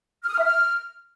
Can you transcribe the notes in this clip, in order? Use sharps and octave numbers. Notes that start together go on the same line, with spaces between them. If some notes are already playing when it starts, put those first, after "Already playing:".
F6
D#6
F6
E5
F6